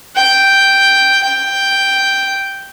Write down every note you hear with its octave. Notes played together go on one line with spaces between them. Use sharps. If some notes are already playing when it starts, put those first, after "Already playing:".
G5
G5